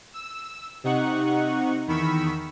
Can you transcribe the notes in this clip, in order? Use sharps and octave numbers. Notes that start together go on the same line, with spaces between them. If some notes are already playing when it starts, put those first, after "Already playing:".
E6
C3 D#4 F#5 C#6
E2 D#3 B5 C#6 E6